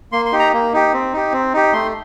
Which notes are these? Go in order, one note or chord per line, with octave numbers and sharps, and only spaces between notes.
A#3 C6
C6
D#4 G4
A#5
A#3
D#4 G4
C4
D#4 G4
C4
D#4 G4
A3 C6